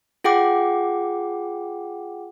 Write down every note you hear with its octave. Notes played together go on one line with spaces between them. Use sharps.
F4 G#4 F#5 G5 D6